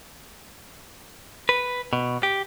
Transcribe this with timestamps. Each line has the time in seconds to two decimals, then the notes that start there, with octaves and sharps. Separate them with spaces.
1.49 B4
1.93 B2
2.23 G4